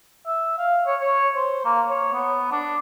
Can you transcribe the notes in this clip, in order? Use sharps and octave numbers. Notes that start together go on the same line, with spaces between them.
E5
F5
C#5
C#5
C5
A#3
C#5
B3
D4